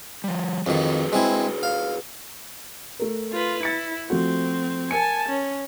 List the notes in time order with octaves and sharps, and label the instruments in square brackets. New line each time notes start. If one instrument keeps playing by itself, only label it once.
[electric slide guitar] F3 G3
[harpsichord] F2 D#3 [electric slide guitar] F#4 G#4 B4
[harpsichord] G#3 C4 E4
F5
[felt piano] A3 A#4
[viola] F4 B4
[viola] E4 [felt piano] A6 C#7
[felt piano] F3 A3 F#4 [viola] C4
[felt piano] A#4 C#7 [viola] G#5 A5
[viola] C#4